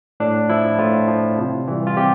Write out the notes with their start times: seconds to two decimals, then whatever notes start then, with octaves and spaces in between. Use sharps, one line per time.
0.20 A2 D4
0.49 F3 E4
0.78 A2 F4
1.08 F3
1.38 C3
1.68 E3 G3
1.87 F4
1.96 C3 G4